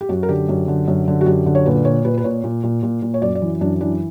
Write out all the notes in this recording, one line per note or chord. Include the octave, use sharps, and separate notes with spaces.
G4
F#2 F#4
A#4
D3 G4
F#2
D3
F#2
D3
F#4
F#2 G4
D3
C#5
A#2 B4
A#2 C#5
A#2 B4
B4
A#2 C#5
A#2
A#2
A#2
A#2
C#5
F#2 D5
D5
E3
F#2 D4
E3 D4